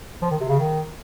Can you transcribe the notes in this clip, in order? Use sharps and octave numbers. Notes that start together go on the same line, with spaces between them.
F3
D#3
C3
C#3
D#3